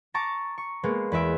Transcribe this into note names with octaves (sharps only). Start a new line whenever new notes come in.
A5 A#5 C#6 D6 A6
C#6
G#3 A#3 B3
E2 B4 E5 D7